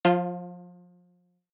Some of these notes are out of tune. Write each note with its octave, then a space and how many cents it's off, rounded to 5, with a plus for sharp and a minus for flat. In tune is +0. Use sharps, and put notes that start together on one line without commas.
F3 +30 F4 +0